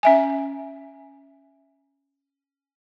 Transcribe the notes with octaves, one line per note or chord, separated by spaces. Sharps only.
C#4 E5 G#5